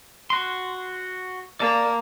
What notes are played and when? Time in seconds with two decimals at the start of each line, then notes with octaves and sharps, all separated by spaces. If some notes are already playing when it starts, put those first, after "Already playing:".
0.30 F#4 C6
1.60 A#3 D5 A5